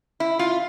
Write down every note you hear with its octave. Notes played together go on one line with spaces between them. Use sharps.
E4
F4